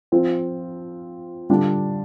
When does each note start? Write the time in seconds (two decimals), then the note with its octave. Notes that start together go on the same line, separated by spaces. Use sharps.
0.12 F3 C4 F4
1.50 D3 G3 D4 F4